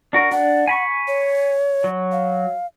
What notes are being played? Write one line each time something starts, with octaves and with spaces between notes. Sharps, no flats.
D4 F#4 A#4
D4 F#5
G#5 B5 C#6
C#5
F#3
F5